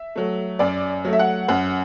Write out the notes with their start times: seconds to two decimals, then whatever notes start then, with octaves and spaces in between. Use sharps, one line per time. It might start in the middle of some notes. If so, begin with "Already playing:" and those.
Already playing: E5
0.16 F#3 A3
0.59 F#2 D5
1.05 F#3 A3
1.13 E5
1.19 F#5
1.48 F#2 F#5